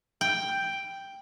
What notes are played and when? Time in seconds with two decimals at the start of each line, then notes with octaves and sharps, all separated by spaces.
0.21 G5